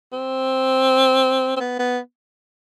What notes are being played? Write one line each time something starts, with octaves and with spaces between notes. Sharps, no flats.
C4
C4
B3
B3